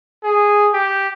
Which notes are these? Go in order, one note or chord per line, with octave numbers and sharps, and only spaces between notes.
G#4
G4